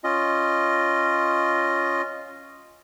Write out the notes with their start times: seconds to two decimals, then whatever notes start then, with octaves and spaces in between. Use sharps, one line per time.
0.04 C#4 F4 D#5